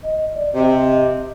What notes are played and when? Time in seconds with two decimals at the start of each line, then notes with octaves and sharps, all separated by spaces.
0.03 D#5
0.34 D5
0.55 C3 D#5